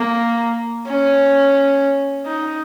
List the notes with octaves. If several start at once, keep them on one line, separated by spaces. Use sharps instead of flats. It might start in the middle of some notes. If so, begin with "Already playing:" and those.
Already playing: A#3
C#4
D#4